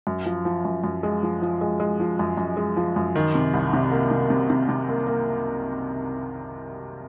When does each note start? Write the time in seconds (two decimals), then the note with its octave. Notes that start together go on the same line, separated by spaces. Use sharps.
0.07 F#2
0.26 F3
0.45 F3
0.65 F#2
0.84 F#2
1.03 G#3
1.23 F3
1.42 F3
1.61 G#3
1.80 G#3
2.00 F3
2.19 F#2
2.37 F#2
2.57 G#3
2.77 F3
2.96 F#2
3.16 D#3
3.35 C3
3.54 C2
3.73 C3
3.92 A#3
4.11 C3
4.30 C3
4.50 C3
4.69 C3
4.89 A#3
5.07 A#3